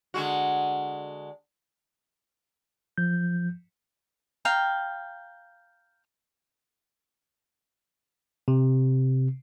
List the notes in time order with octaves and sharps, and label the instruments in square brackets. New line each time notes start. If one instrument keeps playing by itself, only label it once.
[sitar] D3 G#3 F#4
[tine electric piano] F3 G6
[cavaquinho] F5 G5 A#5
[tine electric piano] C3